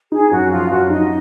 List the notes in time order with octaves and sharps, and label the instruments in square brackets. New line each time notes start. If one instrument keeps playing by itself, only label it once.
[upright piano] D#4 [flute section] G#4
[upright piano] F#2 [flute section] F#4
[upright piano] F3 [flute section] F4
[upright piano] F#2 [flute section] F#4
[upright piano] D#4 [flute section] D#5